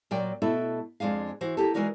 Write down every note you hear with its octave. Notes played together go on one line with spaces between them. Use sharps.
A#2 F#3 D5 G5
B2 A3 E4 F#4 A4
F2 G#3 D4 G#4 F5
E3 F#4 C5
A#3 G4 A4
E3 G#3 D#4 F#4 A#4 D5